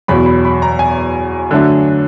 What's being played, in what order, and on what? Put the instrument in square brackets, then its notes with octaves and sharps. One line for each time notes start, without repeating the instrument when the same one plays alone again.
[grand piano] E2 B2 F#3 B5
B5
B5
A#5
G#5
D3 F#3 A3 D4